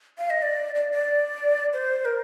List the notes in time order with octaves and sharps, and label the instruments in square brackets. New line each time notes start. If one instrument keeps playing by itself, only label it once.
[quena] F5
D#5
D5
D5
D5
C5
A#4